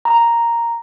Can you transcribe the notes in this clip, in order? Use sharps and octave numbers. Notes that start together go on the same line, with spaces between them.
A#5